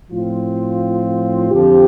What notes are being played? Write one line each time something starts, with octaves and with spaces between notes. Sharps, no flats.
A2 F3 C4 F4
F2 D3 F3 C4 G4